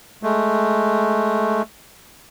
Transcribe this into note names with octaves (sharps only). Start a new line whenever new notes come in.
G#3 A3